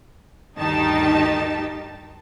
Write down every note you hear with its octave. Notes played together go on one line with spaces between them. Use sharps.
D2 G2 D#3 D#4 G4 A5